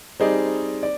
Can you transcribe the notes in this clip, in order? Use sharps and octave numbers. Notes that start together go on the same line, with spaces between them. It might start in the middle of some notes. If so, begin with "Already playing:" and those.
G3 C4 D#4 G#4 D5
D5